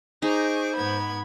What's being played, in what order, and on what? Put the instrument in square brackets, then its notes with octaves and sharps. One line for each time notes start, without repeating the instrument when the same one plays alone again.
[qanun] D#4 [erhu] G#4 [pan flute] C5 [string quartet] C#6 D6
[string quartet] G#2 B3 G#6 [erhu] B5